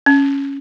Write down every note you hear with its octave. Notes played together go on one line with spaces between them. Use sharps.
C#4